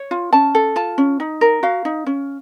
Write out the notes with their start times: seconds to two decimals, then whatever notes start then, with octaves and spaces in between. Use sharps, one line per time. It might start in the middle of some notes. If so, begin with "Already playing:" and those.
Already playing: C#5
0.11 F4
0.33 C#4 A5
0.55 A4
0.76 F4 A5
0.98 C#4
1.20 D#4
1.41 A#4
1.63 F#4 F5
1.85 D#4
2.06 C#4